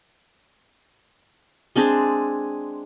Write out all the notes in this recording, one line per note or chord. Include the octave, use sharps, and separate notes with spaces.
G#3 C4 D4 G#4